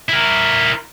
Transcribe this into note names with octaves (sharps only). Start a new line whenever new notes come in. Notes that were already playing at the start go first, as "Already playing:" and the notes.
E4 A#4